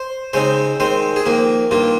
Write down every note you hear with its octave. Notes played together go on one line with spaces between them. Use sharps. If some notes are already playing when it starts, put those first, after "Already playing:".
Already playing: C5
C#3 G#3 C4 D#4 C5
D#3 G#3 C4 C5
G#4
F2 D#3 A#3 A#4
G2 D#3 A#3 F4